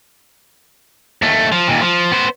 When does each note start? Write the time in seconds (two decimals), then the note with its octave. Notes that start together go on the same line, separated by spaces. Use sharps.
1.22 D#2 A3
1.52 F3
1.68 D#2 A#2
1.81 F3
2.12 B3 C5